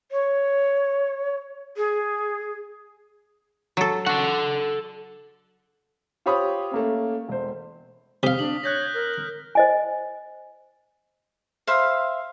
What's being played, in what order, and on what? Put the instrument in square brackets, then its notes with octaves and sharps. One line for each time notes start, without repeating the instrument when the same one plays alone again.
[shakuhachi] C#5
G#4
[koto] F#3 A4
[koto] F#4 [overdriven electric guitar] A4 F#5
[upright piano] F4 G4 C5 C#5 B5 D#6
A3 A#3 C#4
E1 C5
[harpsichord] C3 F5 [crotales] D#6 B6 G7
[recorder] D4 [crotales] F#7
[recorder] C#5 [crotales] F#6 G6 A#6
[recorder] A#4
[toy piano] C5 D#5 G#5
[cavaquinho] C5 E5 F5 B5